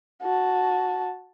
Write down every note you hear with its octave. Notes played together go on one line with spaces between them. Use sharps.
F#4 A5